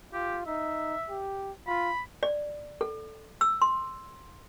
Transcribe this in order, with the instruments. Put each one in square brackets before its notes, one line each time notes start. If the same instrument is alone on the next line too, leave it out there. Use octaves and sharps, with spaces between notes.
[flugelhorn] F4 [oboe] G4
[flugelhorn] D#4 [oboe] E5
[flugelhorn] G4
[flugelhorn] F4 [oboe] B5
[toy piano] D5
A4
E6
C6